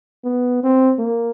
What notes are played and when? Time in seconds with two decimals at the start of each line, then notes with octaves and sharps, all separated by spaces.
0.24 B3
0.63 C4
0.98 A#3